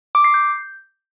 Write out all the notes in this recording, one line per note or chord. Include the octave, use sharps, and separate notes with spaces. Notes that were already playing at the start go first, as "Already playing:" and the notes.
D6
C7
G6